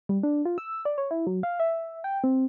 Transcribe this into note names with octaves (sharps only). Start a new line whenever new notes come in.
G3
D4
F4
E6
D5
C#5
E4
F#3
F5
E5
G5
C4